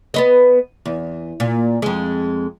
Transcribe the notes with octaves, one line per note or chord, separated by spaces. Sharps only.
B3 B4 D#5
E2
A#2
F2 G#3